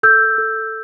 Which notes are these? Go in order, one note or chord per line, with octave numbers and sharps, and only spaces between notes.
A4 E6 G6
A4